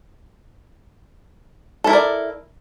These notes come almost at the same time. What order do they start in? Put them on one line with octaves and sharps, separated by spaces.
A4 E4 A#4 D5